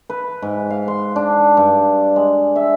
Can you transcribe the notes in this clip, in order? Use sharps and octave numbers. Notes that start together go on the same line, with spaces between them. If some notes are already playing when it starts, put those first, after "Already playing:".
B4
G#2
F5
C6
D4
G2
G#3
E5